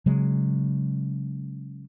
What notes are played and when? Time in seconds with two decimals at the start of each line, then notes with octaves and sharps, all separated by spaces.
0.06 C#3 F#3 G#3